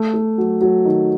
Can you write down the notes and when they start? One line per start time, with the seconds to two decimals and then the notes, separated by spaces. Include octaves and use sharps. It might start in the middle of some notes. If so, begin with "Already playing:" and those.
Already playing: A3
0.14 A3
0.38 F#3
0.61 F#3
0.85 D#3